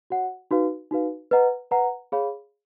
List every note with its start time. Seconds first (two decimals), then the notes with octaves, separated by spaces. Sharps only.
0.10 F#4 C#5 F#5
0.51 D#4 F#4 B4 F5
0.91 D#4 F#4 B4 F5
1.31 B4 D#5 F#5 A#5
1.71 B4 D#5 F#5 A#5
2.12 G#4 C#5 F5 B5